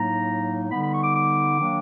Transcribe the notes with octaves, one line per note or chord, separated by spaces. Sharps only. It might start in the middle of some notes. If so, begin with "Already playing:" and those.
Already playing: A2 F#3 A#3 D#4 A#5
D3 G3 B3 D#4 B5
B5
C#6
D6
D6
D#3 F#3 A#3 D4